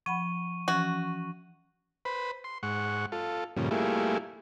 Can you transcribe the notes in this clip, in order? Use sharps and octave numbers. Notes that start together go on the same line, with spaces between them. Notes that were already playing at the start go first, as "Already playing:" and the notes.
F3 F#5 B5 C#6 D#7
E3 F3 C#4 F#4
B4 C5 B5
C6
G#2 F#5 C#6
F4 A4
G2 A#2 C#3 F3
G3 A3 A#3 E4 F4 G#4